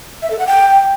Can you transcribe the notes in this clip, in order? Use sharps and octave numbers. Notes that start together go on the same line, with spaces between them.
E5
A4
F#5
G5